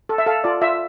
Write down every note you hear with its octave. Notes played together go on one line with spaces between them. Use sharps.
A4
E5
A4 F5
F4 D5
F4 E5